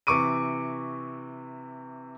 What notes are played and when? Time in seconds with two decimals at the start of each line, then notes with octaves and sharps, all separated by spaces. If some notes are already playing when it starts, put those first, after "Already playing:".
0.07 C3 E3 C#6 D6 D7 D#7